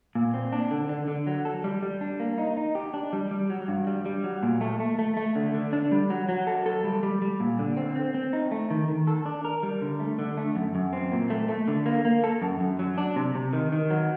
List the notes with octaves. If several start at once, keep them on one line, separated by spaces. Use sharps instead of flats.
A#2
C4
D4
D3
D3
D3
F#3
A4
G3
G3
D4
A#3
D#4
D#4
G4
D4
G3
G3
F#3
G2
G3
G3
F#3
A#2
A3
A3
A3
A3
D3
D3
D4
G3
F#3
F#3
A4
A4
G3
G3
G3
A#2
D3
C4
C4
C4
D#4
A3
D#3
D#3
A4
D4
A#4
G3
D3
A3
D3
A3
F#2
F#2
C4
A#2
A3
A3
D3
A#3
A#3
A4
F#2
F#2
F#3
D4
C3
C3
D#3
D#3
F#3